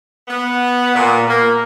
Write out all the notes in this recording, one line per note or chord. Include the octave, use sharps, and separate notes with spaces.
B3
A#2
A#3